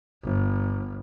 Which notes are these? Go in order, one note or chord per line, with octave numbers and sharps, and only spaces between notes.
G1